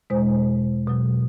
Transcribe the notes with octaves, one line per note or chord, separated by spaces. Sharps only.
E2 B2 G#3 C5
B2 F#3